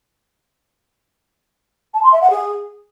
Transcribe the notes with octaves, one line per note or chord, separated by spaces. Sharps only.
A5
C6
E5
F#5
G#4